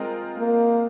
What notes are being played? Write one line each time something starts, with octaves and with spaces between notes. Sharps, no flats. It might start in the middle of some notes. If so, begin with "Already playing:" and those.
Already playing: G#3 C4 F4 A#4 D#5
A#3